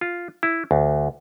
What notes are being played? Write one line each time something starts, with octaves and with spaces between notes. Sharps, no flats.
F4
E4
D2